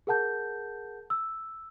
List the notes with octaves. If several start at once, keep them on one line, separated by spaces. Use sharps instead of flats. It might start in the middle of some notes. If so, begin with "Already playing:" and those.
G#4 A#4 F#5 A5 G6
E6